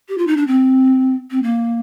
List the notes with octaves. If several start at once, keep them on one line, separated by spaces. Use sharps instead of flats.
G4
F4
D#4
D4
C4
C4
A#3